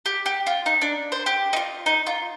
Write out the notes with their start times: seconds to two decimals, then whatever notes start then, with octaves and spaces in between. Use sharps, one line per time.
0.06 G4
0.26 G4
0.47 F4
0.66 D#4
0.82 D4
1.12 C5
1.26 G4
1.53 D#4
1.56 F4
1.86 D#4
2.06 F4